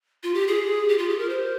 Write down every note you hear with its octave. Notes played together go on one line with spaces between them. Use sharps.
F4
G4
G#4
G4
F4
G4
A#4
C5